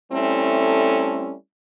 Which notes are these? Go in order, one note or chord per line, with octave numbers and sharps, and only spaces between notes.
G3 A3 C4 C#4 E4 A4